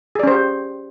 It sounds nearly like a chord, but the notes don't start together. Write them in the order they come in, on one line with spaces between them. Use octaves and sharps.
G#4 D5 C#4 C5 G4